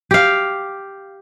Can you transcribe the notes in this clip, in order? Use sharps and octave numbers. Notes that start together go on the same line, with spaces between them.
G4 F5